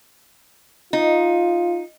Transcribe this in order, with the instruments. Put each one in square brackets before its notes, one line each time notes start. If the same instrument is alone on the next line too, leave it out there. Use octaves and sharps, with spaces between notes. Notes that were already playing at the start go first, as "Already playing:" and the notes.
[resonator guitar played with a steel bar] D#4 [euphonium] F4